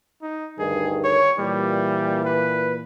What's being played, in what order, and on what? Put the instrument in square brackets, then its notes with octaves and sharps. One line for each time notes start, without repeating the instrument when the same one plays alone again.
[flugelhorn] D#4
[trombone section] D2 G2 D#3 [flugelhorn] G#4
[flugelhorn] C#5
[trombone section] A#2 E3 [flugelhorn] G3
[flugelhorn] B4